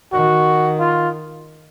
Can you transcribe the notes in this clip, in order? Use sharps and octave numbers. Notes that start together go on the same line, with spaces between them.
D#3 F#4
F4